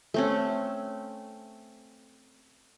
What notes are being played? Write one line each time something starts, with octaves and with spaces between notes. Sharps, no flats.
A3 C4 C#4